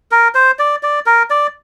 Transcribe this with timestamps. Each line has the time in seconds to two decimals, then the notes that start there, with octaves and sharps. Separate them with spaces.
0.11 A#4
0.35 C5
0.59 D5
0.83 D5
1.06 A#4
1.30 D5